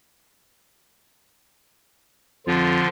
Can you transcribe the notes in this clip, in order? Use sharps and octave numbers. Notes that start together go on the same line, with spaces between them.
F2 D3 F3 F4